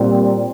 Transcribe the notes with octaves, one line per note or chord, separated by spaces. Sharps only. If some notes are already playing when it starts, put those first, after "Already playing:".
Already playing: A#2 G3 C4